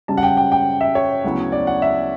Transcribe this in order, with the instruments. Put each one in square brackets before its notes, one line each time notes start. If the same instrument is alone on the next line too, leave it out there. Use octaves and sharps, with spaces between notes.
[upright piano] F#2 C#3 G3 A5
F#5
G5
G5
G5
E5
C#5
D2 C#3 F#3 B3 E4
D5
F#5
E5